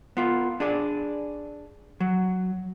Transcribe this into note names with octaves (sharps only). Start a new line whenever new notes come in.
B3 F4
D4 G#4 D5
F#3